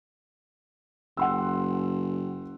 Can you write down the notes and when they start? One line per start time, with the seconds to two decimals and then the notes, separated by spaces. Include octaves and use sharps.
1.17 F#1 F#5 C6 E6